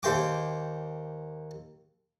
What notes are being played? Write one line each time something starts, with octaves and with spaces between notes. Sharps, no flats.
D#2 C5 G5 D6